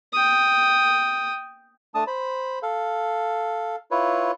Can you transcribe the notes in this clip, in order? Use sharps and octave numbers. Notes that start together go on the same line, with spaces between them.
G5 D#6
A3 D4 A5 D#6
C5 B5
A4 F5
E4 F4 B4 C#5